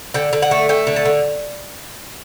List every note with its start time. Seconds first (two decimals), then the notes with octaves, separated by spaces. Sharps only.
0.14 D3 G5
0.33 D3
0.42 F#5
0.51 A3
0.69 A3 G5
0.87 D3
0.96 A5
1.05 D3